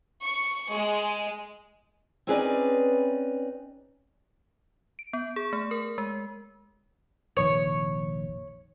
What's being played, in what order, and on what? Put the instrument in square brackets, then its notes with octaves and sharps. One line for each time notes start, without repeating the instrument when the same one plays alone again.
[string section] C#6
G#3
[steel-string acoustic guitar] C4 C#4 D#4 G#4 B4 D5
[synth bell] D7
B3
G#4
A3
A#4
G#3
[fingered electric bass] F1 A#1 D#3 [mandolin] C#5